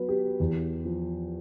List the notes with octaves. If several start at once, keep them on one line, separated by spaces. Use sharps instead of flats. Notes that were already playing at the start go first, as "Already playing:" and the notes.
Already playing: F#3 B3 B4
G4
E2
F3